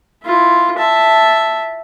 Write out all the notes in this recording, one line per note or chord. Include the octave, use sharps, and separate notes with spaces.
E4 F4
E5 A5